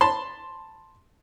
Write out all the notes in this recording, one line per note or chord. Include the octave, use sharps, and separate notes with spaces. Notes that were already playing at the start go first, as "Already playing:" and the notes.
A5 B5 C6